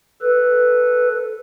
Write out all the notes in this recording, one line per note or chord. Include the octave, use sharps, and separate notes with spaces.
A4 B4